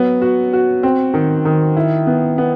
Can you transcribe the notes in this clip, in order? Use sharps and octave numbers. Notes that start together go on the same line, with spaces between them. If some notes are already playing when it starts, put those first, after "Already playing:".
Already playing: F#3 B3
F#4
F#4
C4
D#3
D#3
E4
B3
B3